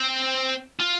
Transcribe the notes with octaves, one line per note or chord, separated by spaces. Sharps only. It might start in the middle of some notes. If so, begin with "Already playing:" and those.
Already playing: C4
F4